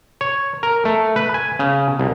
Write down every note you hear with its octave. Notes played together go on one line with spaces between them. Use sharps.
C#5
A#4
A3
B4
G#5
C#3
C2